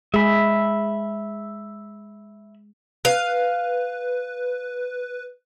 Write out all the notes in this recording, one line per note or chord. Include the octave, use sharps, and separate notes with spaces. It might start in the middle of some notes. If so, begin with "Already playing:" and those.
G#3 G#4 E5 B5
B4 F5